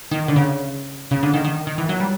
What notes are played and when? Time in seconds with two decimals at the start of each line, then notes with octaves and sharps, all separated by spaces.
0.11 D#3
0.28 D3
0.36 C#3
1.11 C#3
1.23 D3
1.34 D#3
1.44 D#3
1.67 D#3
1.78 E3
1.89 F#3
2.00 G3